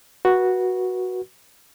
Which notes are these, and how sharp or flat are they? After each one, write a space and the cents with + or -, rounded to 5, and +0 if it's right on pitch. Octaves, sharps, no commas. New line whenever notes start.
F#4 +0 B4 -25